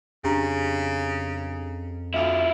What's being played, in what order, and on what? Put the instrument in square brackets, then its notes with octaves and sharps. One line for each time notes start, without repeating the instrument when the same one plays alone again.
[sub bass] F2 [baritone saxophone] C#3 [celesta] D4 G4 A#5
[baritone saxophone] D2 [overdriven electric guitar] E4 F4